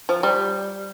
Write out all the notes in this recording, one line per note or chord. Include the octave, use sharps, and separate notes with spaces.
F3
G3